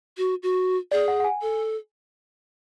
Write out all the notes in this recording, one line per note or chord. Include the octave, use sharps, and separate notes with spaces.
F#4
F#4
G#4 D5
F#5
F#5
G#5
A4